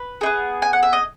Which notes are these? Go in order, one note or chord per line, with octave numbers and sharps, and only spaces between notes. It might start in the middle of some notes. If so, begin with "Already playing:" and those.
Already playing: B4
B3 D#4 G#4
G#5
F#5
E5
D#5